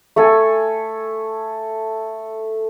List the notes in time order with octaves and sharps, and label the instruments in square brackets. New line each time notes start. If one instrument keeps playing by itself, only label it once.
[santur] A3 A4 G#5